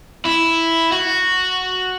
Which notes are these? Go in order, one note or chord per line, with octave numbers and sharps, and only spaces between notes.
E4
F#4